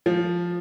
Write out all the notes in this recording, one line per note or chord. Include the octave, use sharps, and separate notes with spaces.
F3